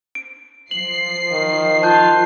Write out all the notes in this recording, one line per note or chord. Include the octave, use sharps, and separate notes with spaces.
D7
F3 C7 F#7
D#3
F4 A5 F#6 G6